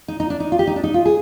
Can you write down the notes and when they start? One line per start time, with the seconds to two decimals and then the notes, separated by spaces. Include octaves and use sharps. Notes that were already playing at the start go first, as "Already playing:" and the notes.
0.08 D#4
0.20 D#4
0.30 D4
0.40 D#4
0.52 F4
0.59 G4
0.67 D#4
0.76 D4
0.84 D#4
0.94 F4
1.06 G#4